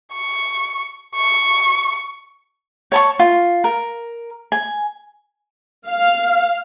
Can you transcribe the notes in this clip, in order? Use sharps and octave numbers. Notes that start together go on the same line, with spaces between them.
C#6
C#6
C#5 A5 C#6
F4
A#4
G#5
F5